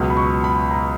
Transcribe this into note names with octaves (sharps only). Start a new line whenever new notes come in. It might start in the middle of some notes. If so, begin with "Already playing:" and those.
Already playing: C#2 B2 F#3
B5
C#6
B5
A#5